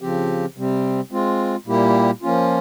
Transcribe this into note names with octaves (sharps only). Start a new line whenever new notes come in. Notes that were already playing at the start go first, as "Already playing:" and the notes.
C#3 F3 C4 G4
C3 G3 C4
G#3 C4 F4
A#2 G3 A#3 E4 G4
F3 A#3 C#4 F4